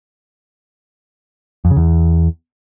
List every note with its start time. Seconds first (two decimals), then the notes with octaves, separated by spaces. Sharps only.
1.65 F2
1.71 C#3
1.77 E2